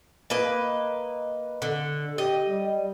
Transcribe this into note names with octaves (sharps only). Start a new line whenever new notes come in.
A#3 B4 D#5
D3
G4 D#5
G3